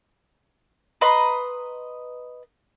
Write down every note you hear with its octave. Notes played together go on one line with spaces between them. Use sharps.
B4 D#5 A#5 C6